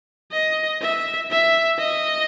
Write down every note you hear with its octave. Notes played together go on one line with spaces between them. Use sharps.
D#5
E5
E5
D#5